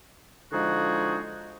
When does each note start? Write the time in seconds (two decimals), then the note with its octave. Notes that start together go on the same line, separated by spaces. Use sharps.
0.52 D3 F3 G#3 D#4 F#4 G#4